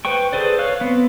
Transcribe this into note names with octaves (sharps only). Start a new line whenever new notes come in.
B4 C5 G5 C#6
G#4 A4 B4 C5 D5
C#5 F5 C#6 F#6
B3 C4